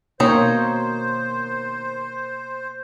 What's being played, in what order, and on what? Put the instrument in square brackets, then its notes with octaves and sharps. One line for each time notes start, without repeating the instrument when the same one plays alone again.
[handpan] B2 A#3 C#5 [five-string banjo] D#3 D#4 [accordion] C5